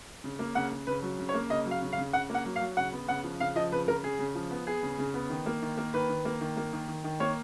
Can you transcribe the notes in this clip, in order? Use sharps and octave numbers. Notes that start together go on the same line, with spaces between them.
C#3
A#3
C#3 F#5
C#3
C#3 B4
F#3
C#3
C#5
A#3
C#3 D#5
F#3
F5
C#3
F5
C#3
C#3 F#5
A#3 F#5
F#3
F5
F#3
C#3 F#5
B3
C#3 F#5
F3
C#3 F5
F3 D#5
C#3 B4
C#3 A#4
C#3 G#4
C#3
F3
B3
B3 G#4
C#3
C#3
B3
D#3
A#3
D#3
A#3
D#3 B4
D#3
A#3
D#3
A#3
D#3
D#3
D#3
A#3 C#5